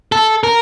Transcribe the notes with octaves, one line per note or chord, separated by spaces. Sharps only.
A4
A#4